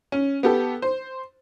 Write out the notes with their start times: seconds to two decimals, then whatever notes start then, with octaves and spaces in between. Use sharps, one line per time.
0.12 C#4
0.43 B3 G4 A4
0.82 C5